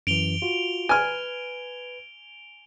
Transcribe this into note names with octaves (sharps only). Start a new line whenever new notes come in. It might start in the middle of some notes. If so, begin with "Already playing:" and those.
F#2 E3 D7 F7 G7
F4 F#4
B4 G#5 F6